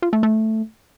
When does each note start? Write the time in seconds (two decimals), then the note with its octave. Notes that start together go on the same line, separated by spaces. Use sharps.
0.02 F4
0.13 A3
0.23 A3